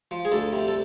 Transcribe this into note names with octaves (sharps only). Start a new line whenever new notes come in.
F3
G#4
D2 A4
C3
A4